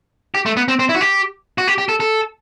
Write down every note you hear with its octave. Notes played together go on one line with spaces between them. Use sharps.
G4
A3
B3
C4
C4
E4
F#4
G4
F#4
G4
G4
A4
A4